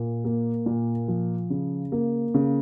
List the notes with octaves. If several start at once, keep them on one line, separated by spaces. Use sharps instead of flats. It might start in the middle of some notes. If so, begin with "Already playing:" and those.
Already playing: A#2
A#3
A#2
F3
C#3
A#3
C#3